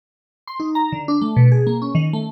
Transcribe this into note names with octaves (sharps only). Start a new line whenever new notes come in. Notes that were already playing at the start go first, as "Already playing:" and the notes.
C6
D#4
A#5
D3
D4
A3
B2
G#4
A#3
C#4
D#3
A3